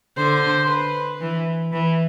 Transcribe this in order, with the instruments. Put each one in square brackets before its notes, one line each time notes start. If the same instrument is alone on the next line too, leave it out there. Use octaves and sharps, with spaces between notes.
[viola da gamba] D3 [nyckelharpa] C5
[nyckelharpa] B4
[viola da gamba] E3
E3